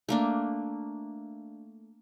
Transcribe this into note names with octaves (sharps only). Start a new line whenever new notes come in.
A3 A#3 D4